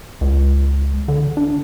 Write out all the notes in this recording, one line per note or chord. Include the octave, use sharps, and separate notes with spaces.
C#2
D3
D4